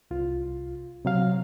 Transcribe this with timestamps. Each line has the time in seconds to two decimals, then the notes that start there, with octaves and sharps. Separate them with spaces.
0.11 C2 F4
1.05 C3 F#3 F5